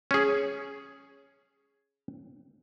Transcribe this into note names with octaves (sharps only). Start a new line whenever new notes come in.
C#4 G#4